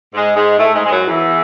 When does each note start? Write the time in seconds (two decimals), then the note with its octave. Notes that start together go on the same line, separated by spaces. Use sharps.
0.14 G#2 G#3
0.35 G#2 G#3
0.58 A2 A3
0.74 G#2 G#3
0.86 G#3
0.91 F#2 F#3
1.07 E2 E3